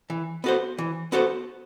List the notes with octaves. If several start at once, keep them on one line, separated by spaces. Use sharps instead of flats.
E3
B3 F#4 A4 C5
E3
B3 F#4 A4 C5